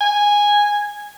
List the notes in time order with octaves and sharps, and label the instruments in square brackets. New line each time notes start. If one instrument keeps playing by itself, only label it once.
[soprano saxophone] G#5